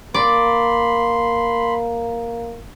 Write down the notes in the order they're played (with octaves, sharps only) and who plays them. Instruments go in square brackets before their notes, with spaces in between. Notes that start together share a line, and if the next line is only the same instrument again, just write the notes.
[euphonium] A#3 [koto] D5 [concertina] B5 C6